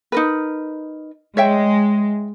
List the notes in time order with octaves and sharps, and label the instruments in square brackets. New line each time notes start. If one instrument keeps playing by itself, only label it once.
[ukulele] D#4 A#4 B4
[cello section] G#3 [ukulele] C#5 E5 G5